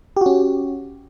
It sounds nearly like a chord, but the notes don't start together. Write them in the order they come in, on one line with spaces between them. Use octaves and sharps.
G4 F#4 C#4